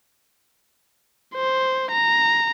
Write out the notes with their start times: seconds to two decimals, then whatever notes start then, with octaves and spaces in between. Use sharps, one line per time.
1.35 C5
1.91 A#5